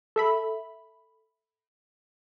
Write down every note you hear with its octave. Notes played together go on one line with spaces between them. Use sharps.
A4 E5 B5